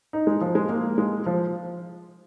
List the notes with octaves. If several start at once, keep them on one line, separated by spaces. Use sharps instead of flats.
D#4
G#3
F3
G#3
A#3
G#3
F3